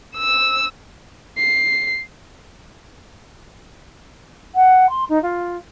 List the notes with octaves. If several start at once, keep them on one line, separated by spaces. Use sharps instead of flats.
E6
C7
F#5
C6
D#4
F4